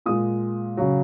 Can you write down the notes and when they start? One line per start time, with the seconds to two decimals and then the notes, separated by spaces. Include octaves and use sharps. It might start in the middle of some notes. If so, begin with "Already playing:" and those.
0.06 A#2 G#3 D#6
0.77 C#3 F#3